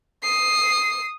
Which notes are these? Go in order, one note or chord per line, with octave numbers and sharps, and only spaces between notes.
D#6 C7